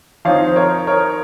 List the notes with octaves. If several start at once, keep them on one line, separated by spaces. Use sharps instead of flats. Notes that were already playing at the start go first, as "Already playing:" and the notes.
F3 C4 D#4 C#5 F5
C5
A#4 C#5
A#4 C#5